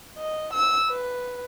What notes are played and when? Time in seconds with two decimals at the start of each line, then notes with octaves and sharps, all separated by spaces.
0.18 D#5
0.53 E6
0.89 B4